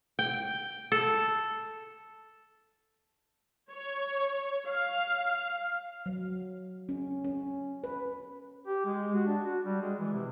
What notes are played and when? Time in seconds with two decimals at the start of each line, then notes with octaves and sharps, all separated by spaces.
0.19 G5
0.92 A4
3.71 C#5
4.68 F5
6.06 F#3
6.89 C#4
7.24 C#4
7.84 B4
8.67 G4
8.85 G#3
9.15 F#4
9.27 D4
9.44 F#4
9.64 G3
9.81 G#3
10.00 E3
10.13 C3